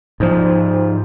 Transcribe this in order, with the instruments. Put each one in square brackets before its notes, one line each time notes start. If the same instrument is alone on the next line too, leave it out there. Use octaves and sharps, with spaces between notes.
[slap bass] G#2 F3